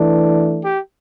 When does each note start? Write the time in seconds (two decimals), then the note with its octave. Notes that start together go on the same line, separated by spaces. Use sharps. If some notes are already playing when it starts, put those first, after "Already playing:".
Already playing: E3 A3 D4
0.62 G4